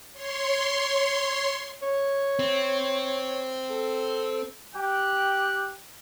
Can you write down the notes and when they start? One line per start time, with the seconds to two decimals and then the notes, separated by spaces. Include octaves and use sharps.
0.13 C#5 C6
1.82 C#5
2.39 C4
3.70 A4
4.75 G4 G5 F#6